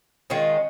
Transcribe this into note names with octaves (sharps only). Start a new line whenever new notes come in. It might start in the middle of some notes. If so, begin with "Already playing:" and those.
D#3 G#3 C#4 F4